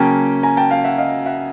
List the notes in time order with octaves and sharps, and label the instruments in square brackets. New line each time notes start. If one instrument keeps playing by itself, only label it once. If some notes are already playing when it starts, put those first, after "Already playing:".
Already playing: [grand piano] C#3 F#3 A#3 C#4 G5 A5
G#5 A#5
G5 A5
F5 G5
E5 F#5
D#5 F5
E5 F#5